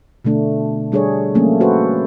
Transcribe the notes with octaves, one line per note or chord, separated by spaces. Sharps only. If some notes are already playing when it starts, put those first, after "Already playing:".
B2 D3 A3 D4
G3 D4 G#4 A4 C#5
F3 F#3 A3 A#3 C#4
F#4 A4 B4 C5